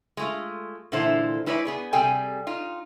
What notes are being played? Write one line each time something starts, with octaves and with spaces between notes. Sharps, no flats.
G#3 A3 F4
A#2 D3 E3 E4 A4 C5
G#3 E4 B4 C#5 D5
B3 G#4 B4
C3 G3 G#4 A4 G5 G#5
D#4 F4